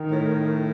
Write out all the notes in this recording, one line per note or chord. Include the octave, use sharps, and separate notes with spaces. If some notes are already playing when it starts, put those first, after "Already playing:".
Already playing: D#3
A2